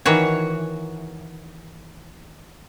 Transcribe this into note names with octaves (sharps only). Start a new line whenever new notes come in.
D#3 E3 F#4 C#5